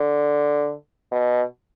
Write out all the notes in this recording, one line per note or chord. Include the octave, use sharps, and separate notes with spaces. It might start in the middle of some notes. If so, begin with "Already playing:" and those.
Already playing: D3
B2